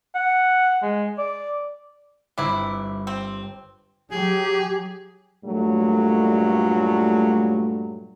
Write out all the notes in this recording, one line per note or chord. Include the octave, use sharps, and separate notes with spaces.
F#5
G#3
D5
G1 C4 E4 B4 D6
C4
F#3 G4 G#4
G2 A#2 F#3 A3